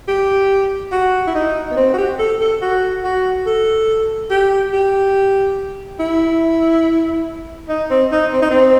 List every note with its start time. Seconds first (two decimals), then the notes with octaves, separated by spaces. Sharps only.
0.08 G4
0.92 F#4
1.27 E4
1.35 D#4
1.71 B3
1.77 C4
1.93 F#4
1.98 G4
2.19 A4
2.40 A4
2.61 F#4
3.04 F#4
3.46 A4
4.31 G4
4.73 G4
6.00 E4
7.69 D#4
7.90 C4
8.12 D#4
8.33 C4
8.42 D#4
8.51 C4